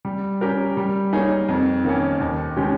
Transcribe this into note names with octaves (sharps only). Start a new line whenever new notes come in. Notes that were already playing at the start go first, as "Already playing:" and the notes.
G3
C#4 G4 A#4
G3
A#3 D#4 G#4 C#5
F2
D#3 A#3 C#4
D#2
D#3 G#3 C#4 G4